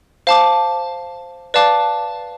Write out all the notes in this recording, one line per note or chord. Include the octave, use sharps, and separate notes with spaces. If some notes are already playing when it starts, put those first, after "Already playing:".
C5 F5 A5 D6
B4 D5 F5 A5 D6